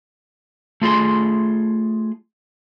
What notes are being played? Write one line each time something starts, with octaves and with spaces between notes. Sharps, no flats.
A3 F4 G#4 C6